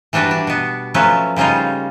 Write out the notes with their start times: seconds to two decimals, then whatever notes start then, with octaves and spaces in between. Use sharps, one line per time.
0.13 E3 G3 D4 F#4 B4
0.31 D4
0.47 B2 B3
0.94 F3 F#3 A3 C#4 B4
1.36 C#3 G3 C#4 D#4 F4